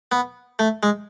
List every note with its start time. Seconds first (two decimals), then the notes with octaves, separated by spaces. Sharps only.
0.12 B3
0.59 A3
0.83 G#3